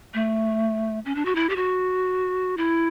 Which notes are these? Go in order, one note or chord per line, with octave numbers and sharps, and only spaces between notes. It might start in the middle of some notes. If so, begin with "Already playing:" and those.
A3
C#4
D4
F#4
E4
G4
F#4
E4